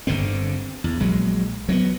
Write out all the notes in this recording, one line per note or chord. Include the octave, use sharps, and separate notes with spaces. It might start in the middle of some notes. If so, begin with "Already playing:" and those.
G1 G2 D3 C4
E2
A#1 F#3 G#3
F#3 A#3 B3